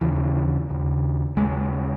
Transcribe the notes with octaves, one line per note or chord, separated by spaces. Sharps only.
D#2 C#3 E3
D#2 C#3
D#2 C#3 G#3